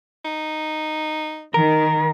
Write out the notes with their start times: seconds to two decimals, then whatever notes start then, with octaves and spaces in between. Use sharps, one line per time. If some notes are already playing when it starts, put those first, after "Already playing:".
0.25 D#4
1.54 D#3 A#4